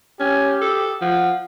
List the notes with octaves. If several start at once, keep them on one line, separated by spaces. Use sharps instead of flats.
C#4 G4
A4
F3 F#5